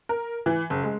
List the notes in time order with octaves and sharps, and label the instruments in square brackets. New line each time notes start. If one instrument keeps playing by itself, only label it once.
[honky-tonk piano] A#4
E3
F#1
G#3